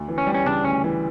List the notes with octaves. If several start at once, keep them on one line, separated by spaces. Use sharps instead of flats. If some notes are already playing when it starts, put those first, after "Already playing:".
Already playing: D2
E3
C#4
G3
C#4
C#3 D4
D2 C#4
E3